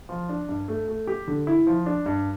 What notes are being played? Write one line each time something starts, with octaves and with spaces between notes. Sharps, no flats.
F3
D4
G2
A3
A3
G4
D3
E4
F3
D4
G2